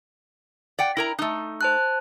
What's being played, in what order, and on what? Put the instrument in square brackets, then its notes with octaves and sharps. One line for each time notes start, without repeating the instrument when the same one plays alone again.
[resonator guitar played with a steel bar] D5 F#5 G5
E4 A#4 A#5
A3 D#4
[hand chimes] C5 A5 F#6